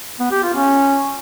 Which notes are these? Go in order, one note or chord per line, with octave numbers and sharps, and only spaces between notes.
B3
G4
F4
C#4